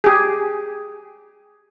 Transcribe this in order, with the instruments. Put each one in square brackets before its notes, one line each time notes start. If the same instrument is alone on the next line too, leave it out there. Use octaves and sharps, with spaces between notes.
[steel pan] G4 G#4